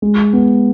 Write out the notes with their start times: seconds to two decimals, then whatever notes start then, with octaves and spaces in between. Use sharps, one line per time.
0.02 G#3
0.33 B3